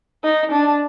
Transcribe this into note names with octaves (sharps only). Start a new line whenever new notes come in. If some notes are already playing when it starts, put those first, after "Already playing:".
D#4
D4